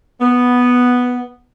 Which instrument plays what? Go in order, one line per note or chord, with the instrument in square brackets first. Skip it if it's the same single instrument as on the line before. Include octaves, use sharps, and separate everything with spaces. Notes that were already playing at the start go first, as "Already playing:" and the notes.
[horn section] B3